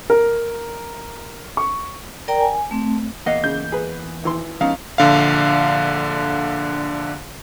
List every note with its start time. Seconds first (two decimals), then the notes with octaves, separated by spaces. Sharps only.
0.10 A#4
1.57 C#6
2.28 A#4 D5 G5 A#5
2.41 G#5
2.71 A3 C4
3.26 E2 A#3 D#5 F5 F#5
3.44 C#3 G6
3.72 G#4 B4
4.23 G#1 E3 C6
4.61 F3 G#3 B3 C#4 D#4 F5
4.98 A#1 D3 F5